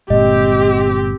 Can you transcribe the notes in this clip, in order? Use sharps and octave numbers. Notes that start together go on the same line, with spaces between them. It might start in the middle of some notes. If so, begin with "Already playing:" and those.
G1 A#2 G#3 C4 G4 D#5